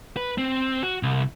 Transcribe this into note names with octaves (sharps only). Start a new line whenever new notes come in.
B4
C4
F#4
C2